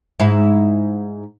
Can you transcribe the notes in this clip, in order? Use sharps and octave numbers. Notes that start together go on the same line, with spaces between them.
G#2 E4